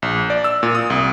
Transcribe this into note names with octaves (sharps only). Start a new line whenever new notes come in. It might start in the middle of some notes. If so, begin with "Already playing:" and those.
A#1
D5
E6
A#2
D#6
C2